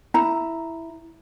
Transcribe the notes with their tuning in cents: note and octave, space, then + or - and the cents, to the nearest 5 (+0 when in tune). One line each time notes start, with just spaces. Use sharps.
E4 +0 A#5 +0